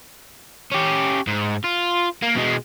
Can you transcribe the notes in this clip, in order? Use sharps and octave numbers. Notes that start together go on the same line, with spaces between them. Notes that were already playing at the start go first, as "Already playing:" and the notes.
C#4 G4
G#2
F4
A#3
B2 G#3